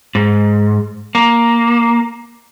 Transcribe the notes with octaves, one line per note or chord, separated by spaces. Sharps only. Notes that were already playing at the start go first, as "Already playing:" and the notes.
G#2
A#3